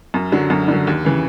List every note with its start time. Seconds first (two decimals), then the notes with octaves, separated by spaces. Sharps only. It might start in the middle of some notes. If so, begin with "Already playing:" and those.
0.14 F#2
0.32 D3 F#3
0.50 F#2
0.68 D3 F#3
0.87 D#2
1.04 C#3 E3